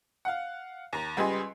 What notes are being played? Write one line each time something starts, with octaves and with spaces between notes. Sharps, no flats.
F5 F#5
D#2 A#5
C#2 G3 B4 D#5 G#5 C6